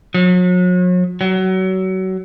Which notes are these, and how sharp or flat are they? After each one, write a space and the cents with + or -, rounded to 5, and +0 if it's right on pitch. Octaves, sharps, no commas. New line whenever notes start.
F#3 -40
F#3 +25